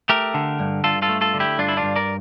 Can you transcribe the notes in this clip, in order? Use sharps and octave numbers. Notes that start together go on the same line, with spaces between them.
A3 G4 A#4
D3
G2
G2 F4 A4
F4 A4
A3
F4 A4
D3
E4 G4
G2 D4 F4
E4
D4 F4
G2
A#4 D5